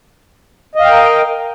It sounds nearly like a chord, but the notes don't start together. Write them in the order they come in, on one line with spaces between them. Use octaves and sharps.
D#5 F5 G5 A#4